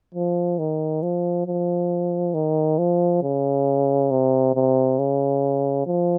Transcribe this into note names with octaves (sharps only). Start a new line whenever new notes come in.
F3
D#3
F3
F3
D#3
F3
C#3
C3
C3
C#3
F3